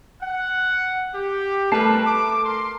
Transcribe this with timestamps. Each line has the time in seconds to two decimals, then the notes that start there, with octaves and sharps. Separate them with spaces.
0.22 F#5
1.14 G4
1.72 G3 A3 A#4 B4 A5 C7
2.06 D6
2.45 A#4 C6